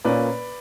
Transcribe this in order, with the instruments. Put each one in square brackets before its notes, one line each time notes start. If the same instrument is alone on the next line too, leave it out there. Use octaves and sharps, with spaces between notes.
[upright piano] A#2 A#3 C#4 B4 D5